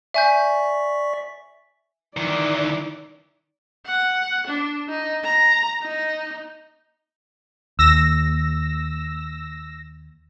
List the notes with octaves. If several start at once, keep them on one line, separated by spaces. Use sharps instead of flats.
D5 E5 G#5 C#6 G6 B6
D#3 E3 D#4 D5
F#5
D4
D#4
A#5
D#4
D#2 E6 A#6